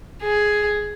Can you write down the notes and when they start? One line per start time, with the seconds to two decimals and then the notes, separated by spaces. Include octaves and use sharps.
0.22 G#4